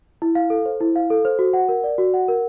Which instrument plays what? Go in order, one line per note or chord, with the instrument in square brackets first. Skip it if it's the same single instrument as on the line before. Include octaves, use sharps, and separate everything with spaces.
[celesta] E4
F5
A4
C5
E4
F5
A4
C5
F#4
F#5
A#4
D5
F#4
F#5
A#4